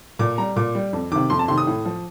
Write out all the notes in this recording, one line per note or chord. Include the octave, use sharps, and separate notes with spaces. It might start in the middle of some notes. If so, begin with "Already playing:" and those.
A#2 D6
G3 A#5
A#2 D6
G3
F2
C3 D#3 D6
F2 C6
A5
C3 D#3 C6
D#6
A2
F3